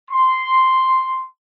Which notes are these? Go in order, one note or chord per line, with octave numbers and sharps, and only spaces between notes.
C6